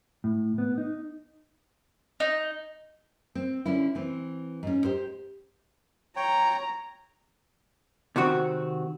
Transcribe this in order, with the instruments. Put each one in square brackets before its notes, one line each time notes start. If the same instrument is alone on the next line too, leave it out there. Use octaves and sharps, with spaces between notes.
[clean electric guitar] A2
B3
D#4
[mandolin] D#4
[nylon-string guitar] C4
D3 C#4 E4
E3 C4
G#2 C#4
G4 C5
[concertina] C#5 G5 [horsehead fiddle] A#5
[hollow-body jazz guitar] C3 D#3 C4 F#4